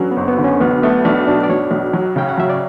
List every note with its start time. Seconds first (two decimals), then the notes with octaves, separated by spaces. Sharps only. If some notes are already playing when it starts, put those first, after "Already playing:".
Already playing: F#3 C#4 D4 A4 B4
0.11 B3
0.16 F#1
0.28 B3
0.38 D3
0.44 C#4
0.60 B1 B3
0.83 A3 B3
1.05 B1 D4
1.27 B2 D4
1.44 D5
1.50 B1 C#5
1.71 B1
1.93 F#3
2.16 C#3 G5
2.29 F#5
2.38 F#3 E5
2.49 D5